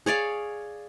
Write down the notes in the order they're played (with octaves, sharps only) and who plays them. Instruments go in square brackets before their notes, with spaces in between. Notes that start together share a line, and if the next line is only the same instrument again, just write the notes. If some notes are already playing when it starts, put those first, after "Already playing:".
[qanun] G#4 C#5 D5 F5